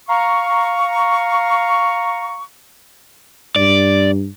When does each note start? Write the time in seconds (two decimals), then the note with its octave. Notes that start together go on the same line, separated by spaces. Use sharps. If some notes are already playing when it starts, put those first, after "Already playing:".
0.09 F5 A#5 C#6
3.56 G2 D5